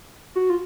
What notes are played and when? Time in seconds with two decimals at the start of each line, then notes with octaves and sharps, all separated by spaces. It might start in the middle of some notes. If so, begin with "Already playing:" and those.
0.36 F#4
0.50 F4